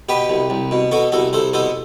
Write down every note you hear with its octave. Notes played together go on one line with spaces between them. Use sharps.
B2 G4 B4
C2
C2
B2
B2 F#4 A4
C2 F#4 A4
C2 A4 C5
B2 A4 C5